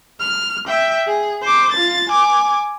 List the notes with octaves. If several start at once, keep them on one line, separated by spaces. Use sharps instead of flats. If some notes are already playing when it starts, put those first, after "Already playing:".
F6
E5 G5
G#4
C5 D6
F4 A6
G#5 D6